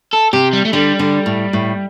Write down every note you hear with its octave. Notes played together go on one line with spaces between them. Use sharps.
A4
C3 G4
G3
A3
D3 G3
D3
A2
A2